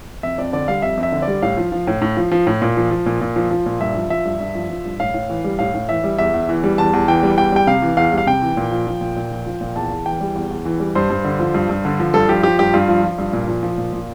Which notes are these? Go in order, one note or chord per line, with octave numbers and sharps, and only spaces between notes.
F2 E5
F2 D5
D3 D5
G3 F5
F2 E5
F2
E5
D3
D5
G3
A2 F5
F3
F3
A2
A2
F3
F3
A2
A#2
F3
F3
A#2
A#2
F3
F3
A#2
G2 E5
F3
F3 E5
G2
G2
F3
F3
G2
A2 F5
A2
E3
G3
A2 F5
A2
E3 E5
G3
E2 E5
E2
E3
G3
E2 A5
E2
E3 G5
G3
E2 G5
G3 G5
C3 F5
E3
E2 F5
G3
F5
C3 G5
E3
A#2
F3
F3
A#2
A#2
F3
F3
A#2
E2 A5
E2
E3 G5
G3
E2
E2
E3
G3
G2 C5
G2
D3
F3
G2
G2
D3
F3
G2 A4
F3 G4
F3 G4
G2 G4
G2 F4
F3
F3
G2
A#2
F3
F3
A#2
A#2